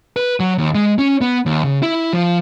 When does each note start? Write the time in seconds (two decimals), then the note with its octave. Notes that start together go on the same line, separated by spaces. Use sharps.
0.16 B4
0.40 F#3
0.58 D#2
0.75 G#3
0.99 C#4
1.21 B3
1.46 D#2
1.64 C#3
1.83 E4
2.13 F3